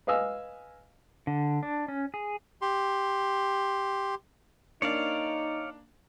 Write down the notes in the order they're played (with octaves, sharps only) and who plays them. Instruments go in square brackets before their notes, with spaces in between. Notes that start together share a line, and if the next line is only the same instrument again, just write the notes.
[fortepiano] B4 D#5 F5 G#5 E6 F6
[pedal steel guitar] D3
D4
C#4
G#4
[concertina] G4 C6
[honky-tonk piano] A#3 D4 [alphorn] D#4 [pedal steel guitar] C#5 D5 F5